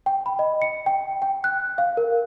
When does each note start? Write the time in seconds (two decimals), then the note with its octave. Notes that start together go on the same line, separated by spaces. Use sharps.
0.06 G5
0.26 B5
0.39 D#5
0.62 C#7
0.86 G5
1.22 G5
1.44 F#6
1.78 F5
1.97 A#4